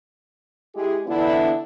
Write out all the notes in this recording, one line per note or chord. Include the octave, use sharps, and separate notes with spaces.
G#3 E4 G4 G#4
D3 E3 B3 D4 E4